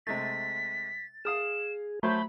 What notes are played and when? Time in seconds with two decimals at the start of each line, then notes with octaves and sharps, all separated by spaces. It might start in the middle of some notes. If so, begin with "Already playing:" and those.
0.07 C3 G#3 A3 A6 B6
1.25 G#4 F5 D#6 F6 E7
2.03 F#3 A3 C5 C#5 A5 B5 G6